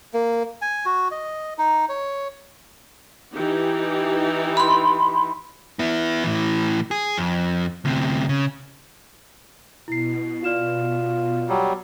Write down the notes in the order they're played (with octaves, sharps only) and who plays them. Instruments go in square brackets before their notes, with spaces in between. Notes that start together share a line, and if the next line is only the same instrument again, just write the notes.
[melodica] A#3
G#5
F#4
D#5
D#4
C#5
[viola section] E3 D#4 G4
[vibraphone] B5 C6
[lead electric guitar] B3 E4
A2 E3
G#4
F2
D2 C3
C#3
[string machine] B2 [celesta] E4 C7
[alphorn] F4 [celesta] D5 F6 E7
[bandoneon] F#3 G3